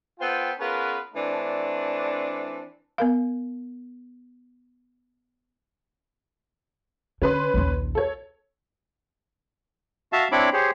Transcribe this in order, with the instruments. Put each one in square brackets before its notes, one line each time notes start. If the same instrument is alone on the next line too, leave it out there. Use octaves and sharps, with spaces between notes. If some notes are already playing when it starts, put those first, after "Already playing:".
[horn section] B3 F4 A4 C5 G5
B3 C#4 F4 G#4 A#4 B4
E3 A3 C4 D4
[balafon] B3 A#4 F5
[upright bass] D3 [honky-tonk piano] C#4 B4 C6
[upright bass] A#1 D#2
[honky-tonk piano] A4 C#5
[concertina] F#4 E5 F5 A5
C4 D4 E4 C#5 B5 D6
G4 G#4 C5 C#5